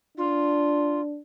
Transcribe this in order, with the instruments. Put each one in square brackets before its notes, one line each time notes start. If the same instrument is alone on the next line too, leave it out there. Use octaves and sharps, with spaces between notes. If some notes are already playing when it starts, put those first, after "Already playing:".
[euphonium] D4 [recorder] F4